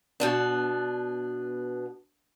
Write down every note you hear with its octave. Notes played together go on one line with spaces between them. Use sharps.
B2 B3 D4